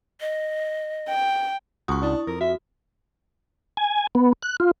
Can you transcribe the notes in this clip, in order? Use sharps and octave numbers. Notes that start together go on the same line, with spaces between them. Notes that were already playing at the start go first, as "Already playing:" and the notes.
D#5
G5
C#2 F#4 C#6 D#6
D4 E4 D#6
F2 A#4
F#4 E5
G#5
B3
F#6
F4